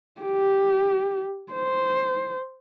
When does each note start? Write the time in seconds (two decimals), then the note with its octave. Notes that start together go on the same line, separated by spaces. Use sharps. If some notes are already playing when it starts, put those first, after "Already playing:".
0.21 G4
1.52 C5